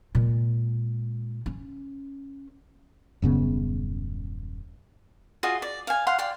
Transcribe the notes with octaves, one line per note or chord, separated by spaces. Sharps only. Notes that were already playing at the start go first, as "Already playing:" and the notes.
A#2 G#3
C#4
D#1 F#2 C#3 B3
F4 F#4 G#4 D#5
D5
F5 G#5
F5 F#5 C6
D5 F5 G5 C6